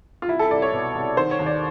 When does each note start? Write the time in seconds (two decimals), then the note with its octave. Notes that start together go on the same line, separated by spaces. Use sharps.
0.22 F4
0.28 C2 E4
0.39 A4
0.51 C2 D5
0.62 C#5
0.72 B2
0.95 C2
1.17 D#3 C5
1.31 C#5
1.39 D#2
1.46 D5